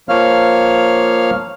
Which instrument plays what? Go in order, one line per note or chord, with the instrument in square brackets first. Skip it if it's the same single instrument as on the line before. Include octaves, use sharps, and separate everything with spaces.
[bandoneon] F3 A#3 C#5 F5 F6